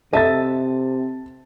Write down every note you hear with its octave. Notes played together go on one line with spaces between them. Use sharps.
C3 A4 D#5 E5 A5 A6